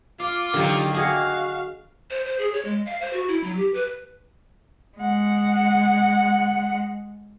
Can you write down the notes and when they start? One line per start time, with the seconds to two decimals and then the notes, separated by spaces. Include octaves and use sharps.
0.20 F4 F5 D6
0.54 D3 D#3 F#3 A#3 G4
0.94 F#4 G#4 D#5 F5 F#5
2.10 C5
2.24 C5
2.39 G#4
2.53 C#5
2.65 G#3
2.86 F5
3.01 C5
3.13 F#4
3.28 E4
3.44 F#3
3.56 G4
3.74 B4
4.98 G#3 F#5